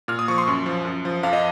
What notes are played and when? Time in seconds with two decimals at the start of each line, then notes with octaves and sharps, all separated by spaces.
0.08 A#2 F6
0.19 D#6
0.28 F3 C#6
0.38 C6
0.48 F#2
0.66 F3
0.85 F#2
1.05 F3
1.23 F2 F5
1.33 D#5